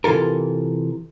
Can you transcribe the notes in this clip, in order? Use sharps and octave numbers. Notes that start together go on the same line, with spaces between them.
C3 E3 F4 A4 A#4